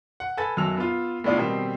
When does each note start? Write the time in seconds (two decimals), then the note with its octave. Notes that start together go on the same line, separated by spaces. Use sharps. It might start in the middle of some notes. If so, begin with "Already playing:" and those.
0.20 F#5
0.37 A4 B4 G#5 B5 A6
0.57 B1 F#2 F#3 A5 E6 F7
0.77 B3 F4
1.24 A2 G#3 B3 D4 E4 F4
1.38 B2 D#3 G3 C4